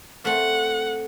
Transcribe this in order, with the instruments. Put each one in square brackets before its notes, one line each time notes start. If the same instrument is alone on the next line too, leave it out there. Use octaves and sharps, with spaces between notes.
[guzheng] A3 C4 [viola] F#5